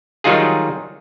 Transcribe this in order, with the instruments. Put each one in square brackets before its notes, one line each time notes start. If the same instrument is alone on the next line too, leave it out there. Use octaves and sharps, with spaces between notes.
[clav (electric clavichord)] D#3 F#3 G3 D#4 F4 G#4